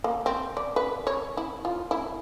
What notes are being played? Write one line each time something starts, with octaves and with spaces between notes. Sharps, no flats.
A#3
C4
D5
B4
C#5
E4
F4
E4